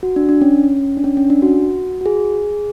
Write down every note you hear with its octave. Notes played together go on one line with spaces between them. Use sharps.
F#4
D4
D4
C#4
D4
C#4
C#4
D4
F#4
F#4
G#4